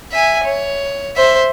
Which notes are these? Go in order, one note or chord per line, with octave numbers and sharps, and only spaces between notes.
E5 G#5
C#5
C5 E5